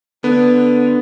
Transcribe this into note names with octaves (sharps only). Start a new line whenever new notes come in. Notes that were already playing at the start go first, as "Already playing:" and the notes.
D3 B3